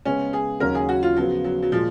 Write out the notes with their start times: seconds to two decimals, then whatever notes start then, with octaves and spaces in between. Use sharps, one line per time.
0.05 C#3 G#3 B3 C#4
0.33 G#4
0.60 D#2 C#3 F#3 C#4 F#4 A#4
0.75 G#4
0.89 F#4
1.03 F4
1.17 C#3 F3 F#3 B3
1.44 F#3
1.63 F#3
1.72 A#2 F3 G#3